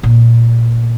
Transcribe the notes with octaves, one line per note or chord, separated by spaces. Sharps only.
A#2